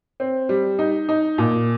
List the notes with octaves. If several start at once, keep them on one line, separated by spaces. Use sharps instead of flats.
C4
G3
D#4
D#4
A#2